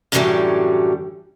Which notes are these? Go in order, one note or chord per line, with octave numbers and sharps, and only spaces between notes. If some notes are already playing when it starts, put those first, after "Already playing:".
F#2 A2 D3 E3 F#3 G3